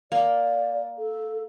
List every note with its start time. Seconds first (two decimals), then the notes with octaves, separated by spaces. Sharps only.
0.12 A#3 D5
0.98 A4